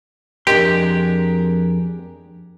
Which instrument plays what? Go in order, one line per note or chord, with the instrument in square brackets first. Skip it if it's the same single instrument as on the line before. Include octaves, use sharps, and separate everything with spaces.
[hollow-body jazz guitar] F2 D#5 C6 [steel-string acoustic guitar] D4 G#4 A#4 [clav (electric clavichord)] G4